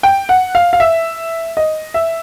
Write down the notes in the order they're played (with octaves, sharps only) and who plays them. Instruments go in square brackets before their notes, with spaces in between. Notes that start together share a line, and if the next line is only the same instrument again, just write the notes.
[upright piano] G5
F#5
F5
F5
E5
D#5
E5